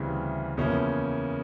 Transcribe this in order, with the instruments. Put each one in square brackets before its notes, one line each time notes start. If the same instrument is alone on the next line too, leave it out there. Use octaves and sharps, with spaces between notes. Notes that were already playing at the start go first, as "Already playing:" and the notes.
Already playing: [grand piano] D2 C#3 E3 G3 C4
E2 C#3 F3 A#3 C#4